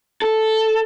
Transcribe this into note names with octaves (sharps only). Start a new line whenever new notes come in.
A4